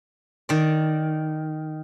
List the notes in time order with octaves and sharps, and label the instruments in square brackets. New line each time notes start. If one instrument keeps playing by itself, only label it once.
[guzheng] D#3 D5